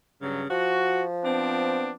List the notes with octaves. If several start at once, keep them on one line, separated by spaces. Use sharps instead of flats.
G2 C#3 F#3
F3 F#4
B3 C4 D4